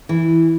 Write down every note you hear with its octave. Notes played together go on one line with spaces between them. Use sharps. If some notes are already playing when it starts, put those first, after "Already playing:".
E3